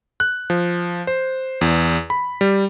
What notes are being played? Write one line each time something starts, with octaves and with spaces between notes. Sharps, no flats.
F#6
F3
C5
E2
B5
G3